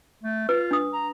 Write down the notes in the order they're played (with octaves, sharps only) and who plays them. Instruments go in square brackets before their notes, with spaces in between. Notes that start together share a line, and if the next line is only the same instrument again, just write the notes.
[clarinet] A3
[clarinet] F4 [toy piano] B4
[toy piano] D4 D#6
[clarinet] A#5